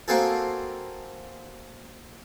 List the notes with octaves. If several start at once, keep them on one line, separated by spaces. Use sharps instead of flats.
A#3 C4 F#4 G#4 A4